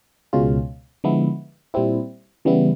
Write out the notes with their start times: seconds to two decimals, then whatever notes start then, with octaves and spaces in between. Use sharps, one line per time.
0.33 C#2 B2 G#3 C#4 F4
1.04 D3 F3 G#3 B3 E4
1.74 A#2 G3 C4 E4
2.45 C#3 E3 G3 B3 E4